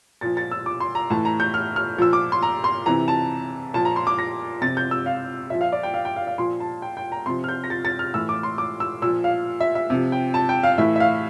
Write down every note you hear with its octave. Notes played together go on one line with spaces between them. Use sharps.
A#2 F3 A6
A6
E6
D6
C6
A#5
A2 E3 A5
A#5
G6
F6
F6
A#2 F3 E6
D6
C6
A#5
C6
C3 E3 A#5
A5
A#2 F3 A5
A#5
C6
D6
A#6
C3 F3 A6
G6
E6
F5
A#2 F3 E5
F5
D5
G5
F5
G5
F5
F5
A#2 F3 C6
A5
G5
G5
A#5
C3 F3 C6
F6
G6
A#6
A6
A6
F6
A2 E3 E6
D6
C6
D6
E6
A#2 F3 E6
F5
E5
E5
C3 F3
G5
A5
G5
F5
A2 E3 E5
E5
F5